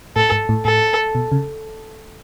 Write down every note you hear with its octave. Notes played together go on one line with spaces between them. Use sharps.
A2 A4
G#2
A2
A2 A4
B2
C#3